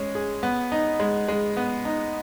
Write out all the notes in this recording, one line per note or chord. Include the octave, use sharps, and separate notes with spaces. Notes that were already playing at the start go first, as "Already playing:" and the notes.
Already playing: G#3 C#4
G#4
B3
D#4
G#3
G#3
B3
D#4